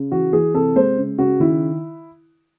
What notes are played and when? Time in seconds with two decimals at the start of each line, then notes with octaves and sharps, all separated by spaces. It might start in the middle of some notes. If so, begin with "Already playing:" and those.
Already playing: C#3
0.12 E3 F#4
0.33 E3 G#4
0.54 C3 A4
0.76 G#3 C5
0.97 C#3
1.18 C#3 F#4
1.40 D#3 E4